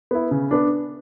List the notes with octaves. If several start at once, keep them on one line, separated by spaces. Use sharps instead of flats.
B3 E4
C#3
B3 D4